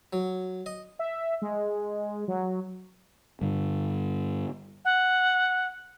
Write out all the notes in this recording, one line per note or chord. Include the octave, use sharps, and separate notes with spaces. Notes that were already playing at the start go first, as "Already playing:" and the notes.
F#3
D#5
E5
G#3
F#3
G2 D3
F#5